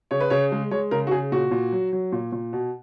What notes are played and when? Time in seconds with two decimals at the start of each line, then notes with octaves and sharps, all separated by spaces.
0.11 C#3 C#5
0.20 B4
0.30 C#3 C#5
0.52 G#3
0.71 G#3 C#5
0.91 C#3 A#4
1.07 F#4
1.11 C#3 G#4
1.32 A#2 F#4
1.51 A#2
1.72 F#3
1.93 F#3
2.12 A#2
2.32 A#2
2.53 B2